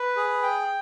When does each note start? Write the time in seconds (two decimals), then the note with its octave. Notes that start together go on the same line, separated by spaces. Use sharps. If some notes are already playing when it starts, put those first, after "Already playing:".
Already playing: B4
0.17 G#4
0.42 G5